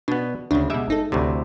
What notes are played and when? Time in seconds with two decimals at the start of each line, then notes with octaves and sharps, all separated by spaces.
0.08 B2 B3 D4
0.51 D2 C#3 D4
0.70 B2 G3 G#3 E5
0.88 G1 D#4 A4
1.12 D2 A2 C3